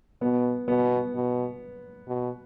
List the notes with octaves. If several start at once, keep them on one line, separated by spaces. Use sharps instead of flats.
B2 B3
B2 B3
B2
B2